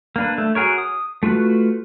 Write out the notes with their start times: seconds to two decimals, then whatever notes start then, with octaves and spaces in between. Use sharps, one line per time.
0.16 A#3 D4 B4
0.38 A3
0.55 F#4 G#4 A#4 C#5
0.78 D#6
1.23 A3 F4 F#4 B4